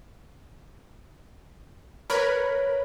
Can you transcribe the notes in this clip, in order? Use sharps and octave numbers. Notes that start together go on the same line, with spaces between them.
A#4 B4 C#5 B5